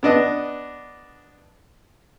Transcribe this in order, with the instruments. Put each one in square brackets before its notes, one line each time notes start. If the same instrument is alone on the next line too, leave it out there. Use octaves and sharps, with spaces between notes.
[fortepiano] B3 D4 D#5